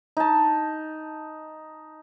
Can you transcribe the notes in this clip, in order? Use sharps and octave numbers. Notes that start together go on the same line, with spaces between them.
D#4 A5